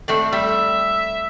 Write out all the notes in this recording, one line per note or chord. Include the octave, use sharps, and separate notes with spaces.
A3 C4 D4
G3 E5